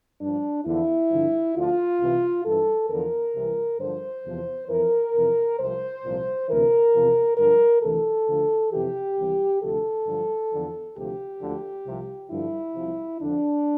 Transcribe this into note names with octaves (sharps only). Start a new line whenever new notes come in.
G2 F3 D4
E2 D3 F3 E4
G2 D3 F3
D2 D3 F3 F4
C2 C3 E3
G2 E3 A4
E2 D3 F3 A#4
C2 C3 E3
G2 D3 F3 C5
E2 C3 F3
F2 E3 A#4
F2 C3 E3
C2 C3 F3 C5
C2 A#2 F3
D2 C3 E3 A#4
E2 C3 F3
G2 D3 F3 A#4
D2 C3 E3 A4
D2 D3 F3
F2 C3 E3 G4
C2 C3 E3
D2 C3 F3 A4
G2 D3 F3
E2 D3 F3
D2 C3 F3 G4
D2 D3 F3
C2 C3 F3
G2 D3 F3 E4
C2 C3 F3
F2 D3 F3 D4